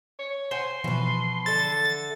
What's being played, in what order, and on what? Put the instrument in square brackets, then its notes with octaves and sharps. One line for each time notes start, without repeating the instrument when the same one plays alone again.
[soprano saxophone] C#5
[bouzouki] C5 F#5 G#5 [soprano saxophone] C6
[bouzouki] B2 B4 [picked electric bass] E3 F3
[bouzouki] D3 A4 E5 [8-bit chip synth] A6